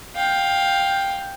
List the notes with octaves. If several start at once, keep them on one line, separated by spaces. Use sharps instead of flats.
F5 G5